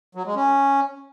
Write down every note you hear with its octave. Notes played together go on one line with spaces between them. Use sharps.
F#3
G#3
C#4